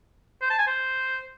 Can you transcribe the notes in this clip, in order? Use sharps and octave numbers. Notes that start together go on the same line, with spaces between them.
C5
A5
G#5
C5